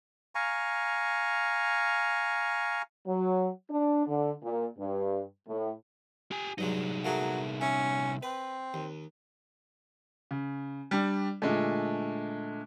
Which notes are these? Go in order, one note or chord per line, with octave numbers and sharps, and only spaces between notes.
F5 G#5 A#5 C#6
F#3
D4
D3
A#2
G2
A2
G4 G#5
C2 G2 F#3 G#3 D#4
F#3 A3 A#3 G#4
C#4 E5
C4 B4
D#2
C#3
G3 D4
A#2 D3 G#3 A3